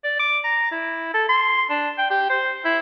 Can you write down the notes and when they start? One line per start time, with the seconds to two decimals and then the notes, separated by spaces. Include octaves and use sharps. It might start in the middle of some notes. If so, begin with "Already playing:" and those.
0.04 D5
0.19 D6
0.44 A#5
0.72 E4
1.14 A4
1.29 C6
1.70 D4
1.98 G5
2.10 G4
2.29 C5
2.65 E4